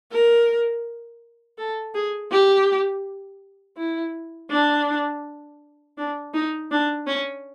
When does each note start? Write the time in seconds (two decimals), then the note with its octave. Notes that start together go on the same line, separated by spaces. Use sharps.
0.12 A#4
1.58 A4
1.94 G#4
2.31 G4
3.77 E4
4.50 D4
5.98 D4
6.34 D#4
6.71 D4
7.07 C#4